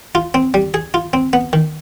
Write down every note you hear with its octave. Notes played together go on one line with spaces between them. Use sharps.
F4
C4
G3
G#4
F4
C4
B3
D#3